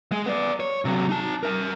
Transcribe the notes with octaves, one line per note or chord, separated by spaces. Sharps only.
G#3
B3 D5
C#5
C3 F#3
D#4 A5
A#4 E5